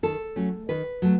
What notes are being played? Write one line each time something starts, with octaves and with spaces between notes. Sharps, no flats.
D#3 A4
F#3 A3 C#4
D#3 B4
F#3 A3